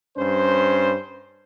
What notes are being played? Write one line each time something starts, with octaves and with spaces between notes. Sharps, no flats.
G2 C#4 C5